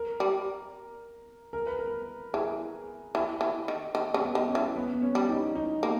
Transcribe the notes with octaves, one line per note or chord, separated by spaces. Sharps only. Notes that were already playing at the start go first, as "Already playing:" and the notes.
Already playing: A#4
G3
A#4
B4
A#4
E3 G#4
E3
E3
D#3
D#3
C#3
B3
D#3
C#4
E3
B3
B3
C#4
G3
D#4
D#4
A#3